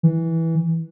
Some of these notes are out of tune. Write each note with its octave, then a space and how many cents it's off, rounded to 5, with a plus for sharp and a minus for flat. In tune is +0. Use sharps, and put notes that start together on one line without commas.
E3 -10